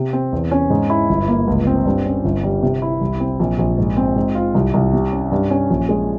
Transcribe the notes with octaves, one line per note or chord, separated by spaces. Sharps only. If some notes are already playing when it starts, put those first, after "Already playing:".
Already playing: C3
C4
E2
C#4
G#2
E4
G1
A#3
C#2
C4
G2
C#4
G1
G3
C3
E4
C2
C4
A#1
A#1
G#2
C4
G#2
F4
C2
C2
C3
C#4
G2
C#4
A#1
G#3